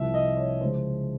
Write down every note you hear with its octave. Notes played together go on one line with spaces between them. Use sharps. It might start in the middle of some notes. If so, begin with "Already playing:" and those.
Already playing: C2 C3 F3 E5
D#5
C#5
C#3 F3 G#3 C5